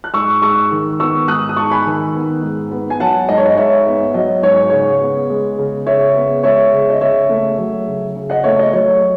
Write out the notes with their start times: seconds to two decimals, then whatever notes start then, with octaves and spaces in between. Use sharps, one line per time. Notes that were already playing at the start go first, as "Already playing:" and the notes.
0.04 F#6
0.14 G#2 C#6 E6
0.42 G#3 C#6 E6
0.72 D#3
1.00 B3 C#6 E6
1.28 G#2 D#6 F#6
1.49 D#6
1.56 G#3 A5 C#6
1.71 G#5 B5
1.86 D#3
2.14 B3
2.42 G#2
2.71 B3
2.90 G#5
3.00 F#3 F#5 A5
3.28 G#2 D#5
3.38 C#5
3.45 D#5
3.57 G#2 C#5 E5
3.86 B3
4.14 F#3 D#5
4.43 G#2 C#5
4.70 C#3 C#5
5.00 B3
5.30 G#3
5.59 C#3
5.86 C#3 C#5 E5
6.15 B3
6.43 G#3 C#5 E5
6.73 C#3
6.90 D#5
7.01 C#3 C#5 E5
7.29 A3
7.58 F#3
7.87 C#3
8.16 C#3
8.30 D#5 F#5
8.44 A3 C#5 E5
8.59 D#5
8.73 F#3 C#5